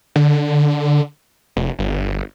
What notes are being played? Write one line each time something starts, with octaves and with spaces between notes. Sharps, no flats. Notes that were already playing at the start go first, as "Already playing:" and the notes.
D3
F1
G1